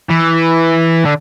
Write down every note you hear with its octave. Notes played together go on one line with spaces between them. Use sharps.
E3
D3